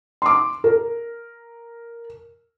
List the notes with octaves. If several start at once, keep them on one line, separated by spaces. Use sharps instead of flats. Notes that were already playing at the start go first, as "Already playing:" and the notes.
C6 D6
A#4